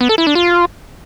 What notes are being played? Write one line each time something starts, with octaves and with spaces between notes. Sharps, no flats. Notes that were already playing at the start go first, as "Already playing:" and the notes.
B3
A4
E4
D4
F4